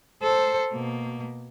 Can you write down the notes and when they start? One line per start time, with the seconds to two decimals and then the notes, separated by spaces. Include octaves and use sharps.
0.23 A4 C5
0.71 B2 A#3